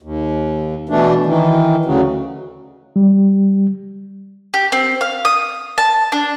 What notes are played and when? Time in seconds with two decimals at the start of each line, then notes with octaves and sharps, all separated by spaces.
0.02 D#2
0.89 B2 E3 A3 D4
1.26 D#3 E3
1.85 D2 C#3 F#3
2.96 G3
4.54 G4
4.72 C4
5.01 F5
5.25 D#6
5.78 A5
6.12 D4